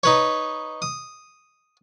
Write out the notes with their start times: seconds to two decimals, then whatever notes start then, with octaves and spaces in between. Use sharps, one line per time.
0.03 D#4 B4 C#5
0.82 D#6